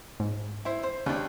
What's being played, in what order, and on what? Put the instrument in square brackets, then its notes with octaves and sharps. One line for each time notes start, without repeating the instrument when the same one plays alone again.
[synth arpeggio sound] G#2
[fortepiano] E4 C5
C5
[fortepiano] D#2 D4 [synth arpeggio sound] C#3